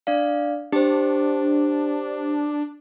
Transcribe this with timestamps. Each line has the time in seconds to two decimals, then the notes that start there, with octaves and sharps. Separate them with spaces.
0.07 D4 D5 F5
0.72 D4 G4 C5